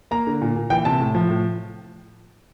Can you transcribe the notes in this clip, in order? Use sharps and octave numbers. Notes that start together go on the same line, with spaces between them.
A#3 A#5
D3
A#2
A#2
E3 G5
C3 A5
A2
F3
A2